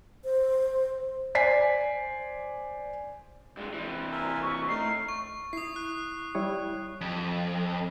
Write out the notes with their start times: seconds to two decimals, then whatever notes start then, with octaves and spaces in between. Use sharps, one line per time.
0.24 C5
1.35 C5 D5 G#5 B6 C7
3.57 G2 G#3
3.74 C3 E3
4.12 A#4 E5 G#5
4.43 E5 C#6
4.69 A2 D#4 A#4 C7
5.09 C#6
5.53 E4 D#6 C7
5.76 F#6
6.35 G3 E4 C#5
7.01 F2